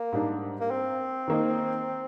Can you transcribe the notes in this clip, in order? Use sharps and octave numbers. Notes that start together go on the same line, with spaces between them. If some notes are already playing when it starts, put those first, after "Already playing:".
Already playing: A#3
G#2 G3 D4
A#3
C4
D#3 A#3 D#4